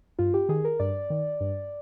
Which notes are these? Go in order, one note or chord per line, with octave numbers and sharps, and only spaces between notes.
G2 F4
G4
D#3 G#4
A#4
G2 D5
D#3
G2